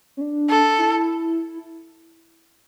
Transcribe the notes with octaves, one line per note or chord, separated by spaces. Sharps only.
C#4
D4
A4
E4